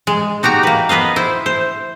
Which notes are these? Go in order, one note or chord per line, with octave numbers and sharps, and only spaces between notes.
G#3
D#4 F#4 G4 A#5
A#3 B4
B3 B4 D#5 F5
E4 C5
C5